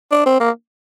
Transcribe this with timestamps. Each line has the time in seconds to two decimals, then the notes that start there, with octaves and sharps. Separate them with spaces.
0.12 D4
0.26 C4
0.40 A#3